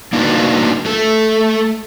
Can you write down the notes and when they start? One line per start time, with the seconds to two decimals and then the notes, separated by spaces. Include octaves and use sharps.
0.13 A#3 D4 D#4 F4 F#4 B4
0.85 A3 A4